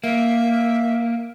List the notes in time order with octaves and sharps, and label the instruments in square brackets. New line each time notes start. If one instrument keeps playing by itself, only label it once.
[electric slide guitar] A#3 [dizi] E5